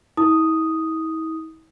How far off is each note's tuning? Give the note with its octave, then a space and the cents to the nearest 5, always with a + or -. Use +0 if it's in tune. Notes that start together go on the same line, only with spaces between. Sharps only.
E4 -45 D#6 +0